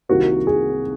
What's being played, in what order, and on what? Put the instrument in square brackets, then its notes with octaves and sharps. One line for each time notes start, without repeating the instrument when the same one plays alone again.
[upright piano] C2 C3 D#3 A#3 F#4
G#4